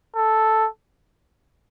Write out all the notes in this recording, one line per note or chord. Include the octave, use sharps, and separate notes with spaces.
A4